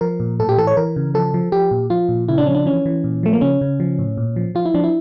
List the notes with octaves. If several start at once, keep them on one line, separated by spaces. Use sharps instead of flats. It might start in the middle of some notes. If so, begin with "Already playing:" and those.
F3 A#4
A#2
A2 A4
G4
E3 A4
C#5
E3 A#4
C#3
F3 A4
F3
F3 G4
A#2
F3 F4
A#2
C#3 E4
D4
F3 C#4
D4
E3 C#4
E3
A#2
F3 A3
A#3
C#3 C#4
C#3
F3
A2
A#2
F3
F3 F4
E4
F3 D4
E4